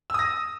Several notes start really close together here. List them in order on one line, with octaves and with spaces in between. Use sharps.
E6 D#6 A#6